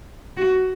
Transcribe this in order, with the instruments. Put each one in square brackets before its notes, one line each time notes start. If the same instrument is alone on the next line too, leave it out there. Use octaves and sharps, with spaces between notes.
[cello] F#4